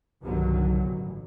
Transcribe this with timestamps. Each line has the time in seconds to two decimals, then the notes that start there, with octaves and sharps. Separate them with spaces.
0.23 C2 G2 D3 D#3 F#3
0.84 A1